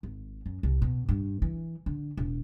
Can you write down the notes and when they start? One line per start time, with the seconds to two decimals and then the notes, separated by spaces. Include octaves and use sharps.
0.03 G#1
0.46 F#2
0.63 C2
0.82 B2
1.09 G2
1.42 E3
1.86 D3
2.17 E1